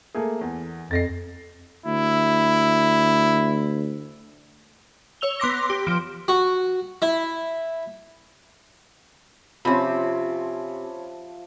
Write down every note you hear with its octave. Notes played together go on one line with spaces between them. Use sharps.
A3 A#3 G#4
E2
F2 A6 A#6 C7
D2 E4
C#5 E6 F7 G7
B3 C6 D6 A#6
G4
F3 D7
F#4
E4
C3 F3 C4 C#4 E5 A5 B5